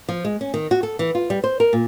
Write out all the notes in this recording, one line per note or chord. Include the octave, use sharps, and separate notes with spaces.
F3
G#3
C#4
D#3
F#4
A4
E3
F4
G3
C5
A#4
A#2